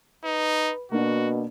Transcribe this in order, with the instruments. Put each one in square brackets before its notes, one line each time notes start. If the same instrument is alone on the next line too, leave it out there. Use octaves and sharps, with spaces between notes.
[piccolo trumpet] D#4 [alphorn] B4
[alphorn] B2 [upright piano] A#3 D4 [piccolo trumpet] F#4